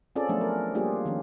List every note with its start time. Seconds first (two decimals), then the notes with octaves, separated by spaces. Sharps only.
0.16 C4 C#4 F4 G#4 A4 D5
0.29 F3 F#3 A3 B3 D4
0.41 A#4
0.75 G3 A#3 D4 F4 G4 G#4
1.05 D#3 F3 C#4